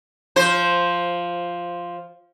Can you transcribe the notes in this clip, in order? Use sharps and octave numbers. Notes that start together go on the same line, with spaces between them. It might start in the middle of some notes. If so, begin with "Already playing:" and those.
F3 C5